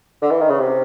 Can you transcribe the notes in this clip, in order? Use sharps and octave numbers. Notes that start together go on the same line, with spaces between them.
D3
E3
D#3
C#3
C3